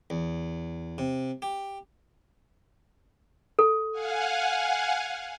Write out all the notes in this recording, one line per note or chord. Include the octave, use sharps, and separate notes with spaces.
E2
C3
G4
A4
F5 F#5 G#5